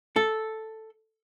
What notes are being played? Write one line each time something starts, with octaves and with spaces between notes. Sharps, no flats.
A4